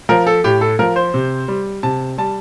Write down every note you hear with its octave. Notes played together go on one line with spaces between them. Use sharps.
F3 A#4
A4
A2 G4
A4
F3 A#4
C5
C3
G3
C3 A5
G3 A5